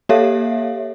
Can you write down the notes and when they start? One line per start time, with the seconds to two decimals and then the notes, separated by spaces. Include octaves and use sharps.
0.09 A#3 G4 A4 C#5 E5 F5